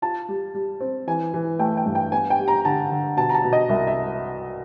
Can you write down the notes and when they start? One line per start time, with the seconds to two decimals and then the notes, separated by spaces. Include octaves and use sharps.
0.02 F4 A5
0.29 G3
0.55 G3
0.80 C4
1.07 E3 G#5
1.34 E3
1.59 A3 G5
1.77 G5
1.86 G2
1.95 G5
2.12 B3 G#5
2.30 G5
2.39 G3
2.48 A#5
2.65 D3 A5
2.91 D3
3.17 B2 A5
3.29 A#5
3.35 A5
3.44 B2
3.53 D#5
3.69 C2 E5
3.87 E5